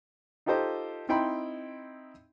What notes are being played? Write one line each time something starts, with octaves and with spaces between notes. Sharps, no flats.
D#4 F4 G4 A4 C5 D#5
C4 D#4 E4 G5 B5 C6